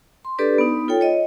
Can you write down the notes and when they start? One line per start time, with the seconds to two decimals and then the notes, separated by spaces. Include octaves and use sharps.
0.25 C6
0.39 D4 G4 A4 B4 D5
0.58 B3 D#4
0.88 F4 A4 C#5 G5
1.01 C#5 D#5